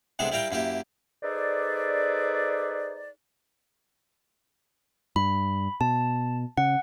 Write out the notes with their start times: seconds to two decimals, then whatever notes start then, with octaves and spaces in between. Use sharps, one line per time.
0.19 C2 C3 G#3 B3 D4 A4
0.32 G3 E4 A#4 F5 G5
0.51 F#2 A#3 E4 G4
1.23 D#4 G#4 A4 B4 C5 D5
5.16 G2 B5
5.81 B2 A5
6.57 C#3 F#5